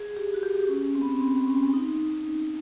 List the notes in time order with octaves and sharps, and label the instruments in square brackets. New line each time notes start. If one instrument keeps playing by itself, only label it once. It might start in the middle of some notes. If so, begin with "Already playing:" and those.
Already playing: [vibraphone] G#4
G4
F#4
G4
C#4
C4
B3
C4
C4
C#4
D#4